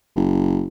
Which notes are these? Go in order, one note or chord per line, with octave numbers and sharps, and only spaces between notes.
F#1